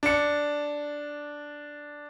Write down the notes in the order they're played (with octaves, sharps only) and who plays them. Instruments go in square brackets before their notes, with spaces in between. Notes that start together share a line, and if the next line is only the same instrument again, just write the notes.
[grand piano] D4 C#7